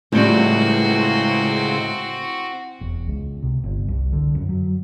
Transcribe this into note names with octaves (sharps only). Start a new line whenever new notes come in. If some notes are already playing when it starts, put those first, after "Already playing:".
C#2 A2 F3 G3 C4 F#4
E1
C#2
C3
G1
C2
D3
F#2
F#3